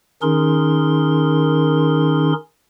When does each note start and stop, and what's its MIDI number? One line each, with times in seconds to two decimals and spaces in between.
0.22 2.33 51
0.22 2.33 61
0.22 2.33 63
0.22 2.33 68
0.22 2.33 70
0.22 2.33 84